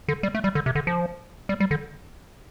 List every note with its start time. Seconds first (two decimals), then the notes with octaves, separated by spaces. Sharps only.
0.08 D3
0.23 G3
0.35 A3
0.44 G3
0.55 D3
0.66 C3
0.75 D3
0.87 F3
1.49 G3
1.60 G3
1.71 D3